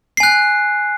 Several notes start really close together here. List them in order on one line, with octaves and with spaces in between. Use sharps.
C7 G#5 F#6